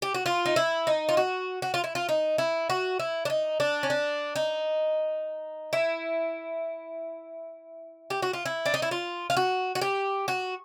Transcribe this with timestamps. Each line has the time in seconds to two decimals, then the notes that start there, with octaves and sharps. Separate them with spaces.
0.02 G4
0.14 F#4
0.26 F4
0.45 D#4
0.56 E4
0.87 D#4
1.09 F4
1.17 F#4
1.62 F#4
1.74 F4
1.84 E4
1.95 F4
2.09 D#4
2.38 E4
2.70 F#4
2.99 E4
3.25 D4
3.30 D#4
3.60 D4
3.83 C#4
3.90 D4
4.36 D#4
5.73 E4
8.10 G4
8.22 F#4
8.33 F4
8.46 E4
8.66 D4
8.74 D#4
8.82 E4
8.91 F4
9.30 F4
9.37 F#4
9.75 F#4
9.82 G4
10.28 F#4